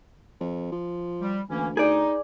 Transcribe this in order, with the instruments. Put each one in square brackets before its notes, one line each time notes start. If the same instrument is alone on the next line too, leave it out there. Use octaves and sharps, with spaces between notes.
[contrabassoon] F2
F3
[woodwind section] G3
[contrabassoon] D2 [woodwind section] E3 A#3 C#4
[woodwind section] D#4 [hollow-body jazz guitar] G#4 D5